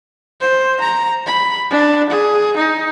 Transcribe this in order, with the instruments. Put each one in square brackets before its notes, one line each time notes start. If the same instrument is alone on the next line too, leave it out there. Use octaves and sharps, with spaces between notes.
[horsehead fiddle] C5
A#5
B5
D4
G#4
D#4